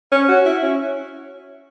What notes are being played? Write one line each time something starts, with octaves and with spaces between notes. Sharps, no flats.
C#4
F#4
E4
C#4